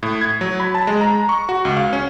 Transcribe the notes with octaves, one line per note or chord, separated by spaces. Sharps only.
A2
G#6
F#3
B5
A5
G#3
A#5
C#6
F#4
C#2
F5
C#4